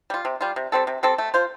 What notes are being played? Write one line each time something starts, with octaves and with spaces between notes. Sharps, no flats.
G3 F4
C3
G3 F4
C3
G3 C4 A4
C3
G3 C4 A4
A3
F4 C5